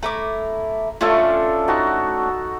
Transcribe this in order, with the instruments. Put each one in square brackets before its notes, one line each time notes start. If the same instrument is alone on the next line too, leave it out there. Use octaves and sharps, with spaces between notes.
[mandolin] A3 E4 D6 [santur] A#5
[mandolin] A3 C#4 D4 [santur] F4 A4
[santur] D#4 F#4 A5